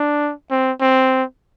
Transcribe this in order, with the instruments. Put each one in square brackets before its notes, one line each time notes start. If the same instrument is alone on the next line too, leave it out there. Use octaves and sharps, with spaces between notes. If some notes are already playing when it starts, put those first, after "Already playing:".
Already playing: [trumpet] D4
C4
C4